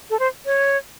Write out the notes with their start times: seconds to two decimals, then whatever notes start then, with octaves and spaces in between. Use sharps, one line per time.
0.10 A4
0.19 C5
0.46 C#5